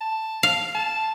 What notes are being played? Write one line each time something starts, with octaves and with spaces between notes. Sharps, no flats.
A5
F5
A5